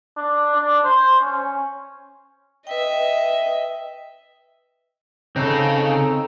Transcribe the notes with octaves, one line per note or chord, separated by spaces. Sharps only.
D4
D4
C5
C#4
B4 D#5 E5 G5
C#3 C4 D#4 A4